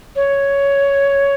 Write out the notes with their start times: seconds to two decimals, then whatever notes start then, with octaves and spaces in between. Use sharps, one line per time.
0.16 C#5